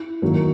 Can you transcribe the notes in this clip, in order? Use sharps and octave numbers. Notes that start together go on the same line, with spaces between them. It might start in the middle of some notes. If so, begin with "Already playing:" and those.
Already playing: E4
D#3 F#3 A#3